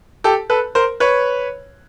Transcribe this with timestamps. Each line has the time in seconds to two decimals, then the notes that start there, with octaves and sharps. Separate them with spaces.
0.24 G4 A4
0.50 A4 B4
0.75 A#4 C5
1.00 B4 C#5